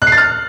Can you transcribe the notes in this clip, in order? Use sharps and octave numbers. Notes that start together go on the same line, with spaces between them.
F#6
C7
A6
F6